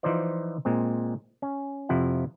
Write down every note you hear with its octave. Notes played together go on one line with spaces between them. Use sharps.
E3 F3 D#4 F4 C5 D5
A#2 G#3 C4
C#4
F2 C3 F3 E4 F#5